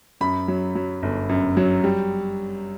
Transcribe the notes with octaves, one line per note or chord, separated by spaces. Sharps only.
F#2 B5
F#3
F#3
G1
F#2
F#3
G3